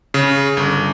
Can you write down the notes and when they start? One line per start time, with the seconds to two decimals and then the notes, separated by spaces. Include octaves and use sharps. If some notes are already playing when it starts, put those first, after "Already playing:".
0.14 C#3
0.57 G1